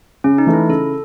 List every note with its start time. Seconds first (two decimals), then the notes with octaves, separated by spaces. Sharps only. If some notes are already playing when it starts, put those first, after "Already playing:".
0.24 C#3 C#4
0.38 D#4
0.47 E3 A3
0.53 E4
0.69 C#3 A4